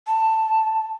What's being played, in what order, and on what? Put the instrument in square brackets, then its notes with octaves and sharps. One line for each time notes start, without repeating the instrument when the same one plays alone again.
[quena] A5